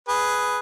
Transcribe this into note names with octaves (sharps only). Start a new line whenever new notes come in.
G#4 B4